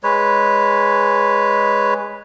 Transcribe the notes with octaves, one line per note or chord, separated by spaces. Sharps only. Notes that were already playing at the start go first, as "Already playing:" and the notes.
G#3 B4 C#5